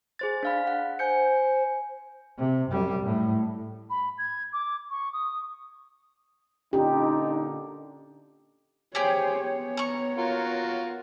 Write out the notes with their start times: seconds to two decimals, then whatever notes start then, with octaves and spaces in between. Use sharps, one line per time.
0.19 G#4 C5 A6
0.43 D4 F5 B5
0.67 F#5
0.99 C5 G#5 G6 C#7
2.38 C3
2.70 F#2 G3
3.03 A2
3.90 B5
4.18 G#6
4.53 D6
4.90 C#6
5.13 D#6
6.73 A#2 D3 C#4 D#4 F4 G4
8.95 G4 G#4 C5 C#5 G5
9.40 B3 C#5
9.77 A#5 C#6
10.18 F4 F#4 A#4